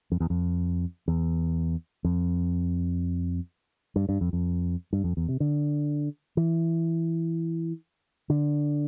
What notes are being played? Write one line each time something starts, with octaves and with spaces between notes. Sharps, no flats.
F2
E2
F2
E2
F2
G2
G2
F2
F2
G2
F2
E2
C3
D3
E3
D3